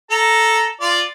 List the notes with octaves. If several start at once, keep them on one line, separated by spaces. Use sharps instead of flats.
A4 A#5
F4 D5